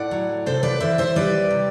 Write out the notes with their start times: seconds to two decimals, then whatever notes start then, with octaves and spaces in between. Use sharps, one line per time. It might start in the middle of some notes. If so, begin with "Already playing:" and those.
Already playing: A2 D5 F#5
0.11 F#3
0.46 C3 A4 C5
0.63 B4 D5
0.80 E3 C5 E5
0.98 C5 E5
1.16 G3 B4 D5
1.51 C3